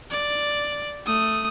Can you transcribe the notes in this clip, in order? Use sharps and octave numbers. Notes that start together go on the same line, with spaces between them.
D5
A3 D#6